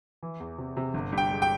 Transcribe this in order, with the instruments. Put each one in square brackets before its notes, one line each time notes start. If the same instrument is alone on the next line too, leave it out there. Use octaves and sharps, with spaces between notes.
[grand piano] E3
E2
C3
C3
G1
G2
G5
G#3
G5